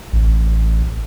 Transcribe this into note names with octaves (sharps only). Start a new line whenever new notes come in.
A1